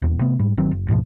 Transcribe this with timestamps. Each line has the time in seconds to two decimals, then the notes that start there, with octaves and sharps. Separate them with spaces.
0.02 D#1 E2
0.21 C3 A3 B3
0.39 G#2 G3
0.57 G1 D#3 F#3 C4
0.71 F#1
0.88 D2 G#2 B2 F3